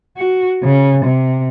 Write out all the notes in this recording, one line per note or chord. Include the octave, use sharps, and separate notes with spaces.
F#4
C#3
C3